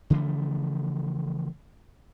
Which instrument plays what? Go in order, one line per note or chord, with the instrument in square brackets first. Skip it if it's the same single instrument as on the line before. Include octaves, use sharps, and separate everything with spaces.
[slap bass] C#3 E3 F3 A3